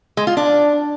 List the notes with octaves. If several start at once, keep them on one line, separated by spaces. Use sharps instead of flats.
G#3
F4
D4